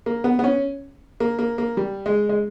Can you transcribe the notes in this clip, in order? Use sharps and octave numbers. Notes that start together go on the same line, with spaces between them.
A#3
B3
B3
C#4
A#3
A#3
A#3
G3
G#3
G#3